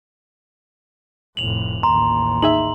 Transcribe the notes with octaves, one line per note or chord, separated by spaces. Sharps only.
F1 A2 F7 F#7
A1 D#2 A#5 C6
D#4 G#4 E5 F#7